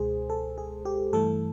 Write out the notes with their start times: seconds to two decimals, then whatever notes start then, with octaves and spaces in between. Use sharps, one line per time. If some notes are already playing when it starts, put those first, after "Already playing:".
Already playing: C#2 B2 G#3 G#4 C5
0.30 A4
0.58 G#4
0.85 G4
1.13 G2 E3 A3 A4